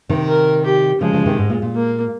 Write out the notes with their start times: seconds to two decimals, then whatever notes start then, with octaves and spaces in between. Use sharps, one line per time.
0.09 C3 D#3
0.28 A#4
0.65 G4
1.01 C#3 F3 G#3
1.14 C#3 F3
1.26 C3 D#3
1.38 G#2
1.50 A#2
1.62 A#2
1.75 A#3